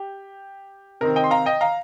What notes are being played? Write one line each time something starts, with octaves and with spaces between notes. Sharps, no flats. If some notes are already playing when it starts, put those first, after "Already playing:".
Already playing: G4
C3 D#3 C4 A#4
D#5 G5
C6
F5 A#5
D#5 G5
F5 A#5